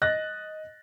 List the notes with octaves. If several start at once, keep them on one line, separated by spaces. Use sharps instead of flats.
D#5 F#6 A6 A#6